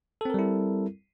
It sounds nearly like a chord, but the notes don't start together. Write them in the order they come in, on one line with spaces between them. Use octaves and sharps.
A4 C4 A#4 G3 E4